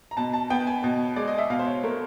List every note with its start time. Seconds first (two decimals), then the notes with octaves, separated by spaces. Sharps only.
0.11 A#5
0.17 B2 A5
0.33 A5
0.50 B3 G5
0.67 G#5
0.84 B2
1.16 G#3 D5
1.28 D#5
1.38 E5
1.50 B2 F5
1.59 C5
1.67 C#5
1.83 A3 A#4